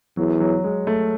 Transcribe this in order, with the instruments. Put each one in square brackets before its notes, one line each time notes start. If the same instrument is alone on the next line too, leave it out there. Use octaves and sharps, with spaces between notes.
[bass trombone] E2 [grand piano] F#3
[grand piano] F#3
G#3
A3